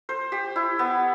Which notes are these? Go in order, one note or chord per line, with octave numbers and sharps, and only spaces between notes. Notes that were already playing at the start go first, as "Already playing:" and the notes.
C5
G4
E4
B3